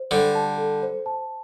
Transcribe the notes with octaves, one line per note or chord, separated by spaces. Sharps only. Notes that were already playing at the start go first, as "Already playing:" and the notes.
Already playing: C5
D3 G3 A4
A5
A4
C5
A5